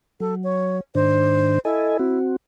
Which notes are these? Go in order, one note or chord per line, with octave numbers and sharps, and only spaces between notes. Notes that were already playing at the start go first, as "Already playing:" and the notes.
F#3 A4
C#5
G#2 D#3 D4 C5
E4 A4 D#5 G#5
C4 F#4